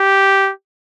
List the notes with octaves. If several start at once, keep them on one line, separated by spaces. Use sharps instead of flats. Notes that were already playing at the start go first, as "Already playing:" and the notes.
Already playing: G4